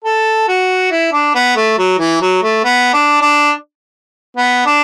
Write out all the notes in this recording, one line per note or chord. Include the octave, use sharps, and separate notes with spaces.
A4
F#4
E4
D4
B3
A3
F#3
E3
F#3
A3
B3
D4
D4
B3
D4